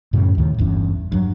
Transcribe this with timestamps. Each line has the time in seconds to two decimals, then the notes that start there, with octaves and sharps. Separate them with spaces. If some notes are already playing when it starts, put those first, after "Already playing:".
0.13 F#2 A2 C#3 G3
0.38 D#2 A2 D#3
0.58 G1 E2 G2 C#4
1.12 G2 F#3